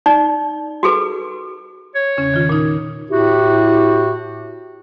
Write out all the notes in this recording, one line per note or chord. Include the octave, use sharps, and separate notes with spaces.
D#4 D5
F#4 G#4 A4 B4 D6
C#5
E2 C#3 C#4
D#3 F4
A#2 D#4
A2 E4 F#4 G4